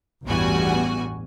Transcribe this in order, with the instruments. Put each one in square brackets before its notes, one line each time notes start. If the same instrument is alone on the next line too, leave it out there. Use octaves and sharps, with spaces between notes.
[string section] A1 E2 G2 G3 F#4 G#5